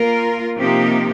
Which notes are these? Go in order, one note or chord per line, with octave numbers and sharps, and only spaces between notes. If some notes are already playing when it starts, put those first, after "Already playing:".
Already playing: A#3 F4 A#4
C3 F3 A#3 D#4 G4